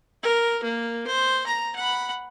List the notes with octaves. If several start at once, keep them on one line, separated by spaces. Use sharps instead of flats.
A#4
A#3
C5
A#5
F#5 B5